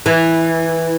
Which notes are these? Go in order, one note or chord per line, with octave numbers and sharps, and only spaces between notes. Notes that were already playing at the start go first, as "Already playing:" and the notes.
E3